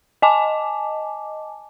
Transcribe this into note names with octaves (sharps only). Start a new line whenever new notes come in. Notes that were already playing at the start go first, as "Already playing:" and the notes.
D#5 G#5 A5 D6